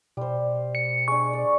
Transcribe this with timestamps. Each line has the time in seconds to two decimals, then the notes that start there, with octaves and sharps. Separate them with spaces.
0.17 B2 G3 C5
0.75 C#7
1.08 G#3 D4 C#6
1.33 D5